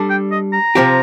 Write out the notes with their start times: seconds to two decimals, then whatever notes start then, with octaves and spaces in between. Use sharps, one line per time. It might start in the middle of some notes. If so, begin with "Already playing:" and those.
Already playing: G3 D4 A4
0.10 G5
0.32 D#5
0.53 A#5
0.75 C3 F3 C4 G4